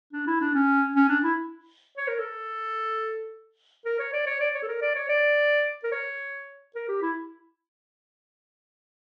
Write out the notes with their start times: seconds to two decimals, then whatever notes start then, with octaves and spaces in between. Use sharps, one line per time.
0.13 D4
0.27 E4
0.41 D4
0.54 C#4
0.96 C#4
1.09 D4
1.23 E4
1.97 C#5
2.08 A#4
2.19 A4
3.85 A#4
3.99 C#5
4.13 D5
4.26 C#5
4.40 D5
4.54 C#5
4.62 A4
4.68 A#4
4.81 D5
4.95 C#5
5.09 D5
5.84 A#4
5.92 C#5
6.75 A#4
6.88 G4
7.02 E4